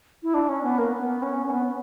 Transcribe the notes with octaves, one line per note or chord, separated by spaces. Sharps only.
E4
D4
C#4
B3
A#3
B3
C#4
C#4
B3